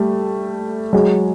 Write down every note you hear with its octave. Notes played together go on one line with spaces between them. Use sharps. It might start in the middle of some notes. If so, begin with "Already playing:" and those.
Already playing: G3 A3
F#3 G#3